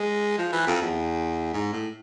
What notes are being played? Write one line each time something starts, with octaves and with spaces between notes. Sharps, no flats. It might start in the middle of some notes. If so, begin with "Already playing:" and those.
Already playing: G#3
F3
E3
F2
E2
G#2
A2